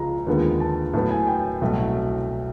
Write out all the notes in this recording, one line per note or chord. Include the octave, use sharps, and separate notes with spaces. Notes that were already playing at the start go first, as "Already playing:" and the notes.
Already playing: C#2 C#3 F3 G#3 A#5
D#2 D3 F3 G#3 B3
A5
A2 F#3 B3 A5
G#5
G5
C2 B2 F#3 A3